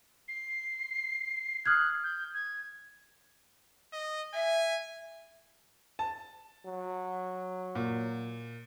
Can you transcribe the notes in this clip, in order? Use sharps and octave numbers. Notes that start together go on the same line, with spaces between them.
C7
D#6 F6 F#6 G#6
G6
G#6
D#5
E5 G#5
A5
F#3
A#2